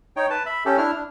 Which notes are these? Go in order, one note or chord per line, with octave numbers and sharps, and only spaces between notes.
D#4 C#5 G5
B4 A5
E5 B5
C#4 G4 A4
D4 E4 F6
D4